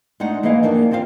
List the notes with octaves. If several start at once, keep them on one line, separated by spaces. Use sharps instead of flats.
G#3 A3 D4 D#4 F#5
E3 A#3 G#4 D#5 F5
F2 D#3 A#3 D4 D#4 A5
E2 C4 F4 C5 F5